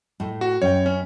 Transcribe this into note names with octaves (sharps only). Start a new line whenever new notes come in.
A2 A3
F#4
F#2 C#5 G5
C#4